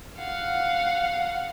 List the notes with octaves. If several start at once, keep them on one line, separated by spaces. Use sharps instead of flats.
F5 F#5